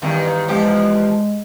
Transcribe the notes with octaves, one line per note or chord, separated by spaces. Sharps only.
E2 G2 D#3
E2 F3 G#3 G4